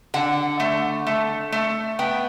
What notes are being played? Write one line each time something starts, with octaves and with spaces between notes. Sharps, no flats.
D3 F#5
A3
A3
A3
B3 G5